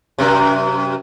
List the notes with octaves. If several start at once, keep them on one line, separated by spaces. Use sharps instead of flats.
F#2 C3